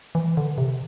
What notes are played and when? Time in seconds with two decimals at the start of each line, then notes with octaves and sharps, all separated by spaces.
0.15 E3
0.37 D3
0.58 C3